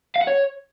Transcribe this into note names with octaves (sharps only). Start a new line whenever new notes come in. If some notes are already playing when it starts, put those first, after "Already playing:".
F5
F#5
C#5